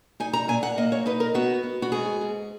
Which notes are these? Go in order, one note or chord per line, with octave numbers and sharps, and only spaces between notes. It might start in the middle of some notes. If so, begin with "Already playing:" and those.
D#4 G#5
A#5
A#2 G#5
F#5
A#3 D#5
C#5
D#4 B4
A#4
B3 F#4
B3
F#4
G#2 G#4
G#2